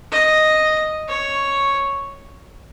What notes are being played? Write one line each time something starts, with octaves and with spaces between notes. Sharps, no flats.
D#5
C#5